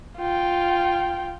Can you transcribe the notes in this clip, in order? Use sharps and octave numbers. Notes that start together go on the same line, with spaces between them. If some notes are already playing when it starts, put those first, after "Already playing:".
F4 G5